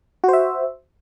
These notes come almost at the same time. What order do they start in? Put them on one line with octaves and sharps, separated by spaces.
F#4 C5 E5